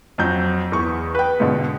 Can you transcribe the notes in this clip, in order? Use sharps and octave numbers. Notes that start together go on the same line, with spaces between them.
F2 F#3 G6
E2 C#6
B4 G5
G#2 B2 D3